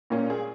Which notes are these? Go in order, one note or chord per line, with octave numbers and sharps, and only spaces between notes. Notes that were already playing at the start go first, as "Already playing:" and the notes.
A#2 A#3 C#4
G#4